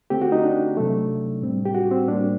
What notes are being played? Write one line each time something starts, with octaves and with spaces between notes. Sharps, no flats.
D3 A3 C4 G4
F#4
D#4
D4
C3 F#3 A3
A2 G3 C4
G4
F#4
C4
A2 G3 A#3 D4